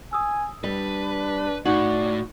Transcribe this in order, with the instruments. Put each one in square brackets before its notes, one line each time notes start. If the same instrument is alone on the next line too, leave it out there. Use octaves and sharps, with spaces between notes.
[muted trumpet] G#5 [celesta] D#6 E6
[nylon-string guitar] G3 [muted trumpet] D4 [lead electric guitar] B4
[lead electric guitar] A2 [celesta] D#4 F#7 [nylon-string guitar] F#4 [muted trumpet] D5